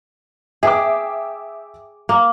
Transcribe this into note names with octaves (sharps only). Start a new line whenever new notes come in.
G#4 E5 G5 D6
A#3